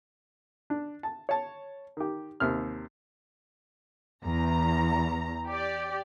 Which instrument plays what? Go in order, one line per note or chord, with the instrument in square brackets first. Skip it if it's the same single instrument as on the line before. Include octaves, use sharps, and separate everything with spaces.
[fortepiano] D4
A5
C#5 A5
D#3 G4
D#2 C3 F6
[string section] E2 A#5
G4 D5